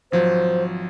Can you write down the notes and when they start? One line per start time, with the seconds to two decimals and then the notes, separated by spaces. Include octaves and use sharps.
0.12 G#1 F3 F#3 C5